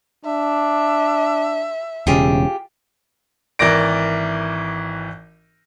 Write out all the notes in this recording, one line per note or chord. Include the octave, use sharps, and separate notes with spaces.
D4 E5
E1 C#3 F4 G4 G#4
G#1 E3 A#4 D5 A#6 D7